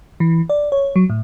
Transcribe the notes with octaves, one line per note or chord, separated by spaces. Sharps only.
E3
D5
C#5
F#3
A2